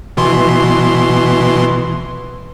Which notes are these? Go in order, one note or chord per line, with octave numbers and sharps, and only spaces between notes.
B2 E3 C6